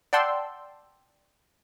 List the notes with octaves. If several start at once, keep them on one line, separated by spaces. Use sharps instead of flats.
D5 F#5 G5 A5 C6 E6